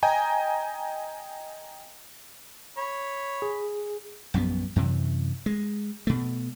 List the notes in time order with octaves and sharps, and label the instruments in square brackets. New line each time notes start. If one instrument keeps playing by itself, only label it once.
[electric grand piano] D#5 G5 G#5 A#5
[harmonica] C#5 B5
[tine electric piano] G#4
[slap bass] A#1 F#2 G3 B3
F#2 C3 E3
G#3
B2 A3